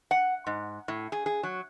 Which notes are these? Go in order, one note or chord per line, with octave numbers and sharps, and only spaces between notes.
F#5
G#2
A2
G#4
G#4
F#3